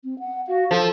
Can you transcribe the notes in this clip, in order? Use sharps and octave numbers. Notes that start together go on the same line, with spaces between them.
C4
F#5
F#4 F5
F3 A4